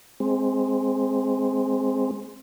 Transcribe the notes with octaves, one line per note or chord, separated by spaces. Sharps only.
G#3 C4